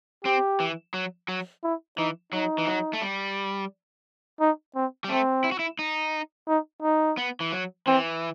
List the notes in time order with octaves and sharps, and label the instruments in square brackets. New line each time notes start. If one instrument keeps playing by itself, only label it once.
[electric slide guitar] C4 [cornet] G4
[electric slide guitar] E3
F#3
F#3
[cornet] E4
[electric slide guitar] E3 [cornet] D#4
[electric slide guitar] F#3 [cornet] D#4
[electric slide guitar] E3
F#3
A3
G3
[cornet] D#4
C4
[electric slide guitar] G3
[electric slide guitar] A3 [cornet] C4
[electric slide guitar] E4
F#4
E4
D#4
[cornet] D#4
D#4
[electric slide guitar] B3
E3
F#3
[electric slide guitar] E3 [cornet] C4